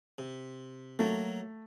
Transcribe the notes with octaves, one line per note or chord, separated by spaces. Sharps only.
C3
F#3 A3 A#3